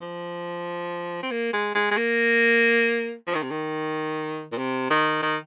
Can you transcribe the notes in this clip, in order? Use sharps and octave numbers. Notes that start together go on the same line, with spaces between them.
F3
C4
A#3
G#3
G#3
G#3
A#3
F3
D#3
C3
D#3
A#2
C3
D#3
D#3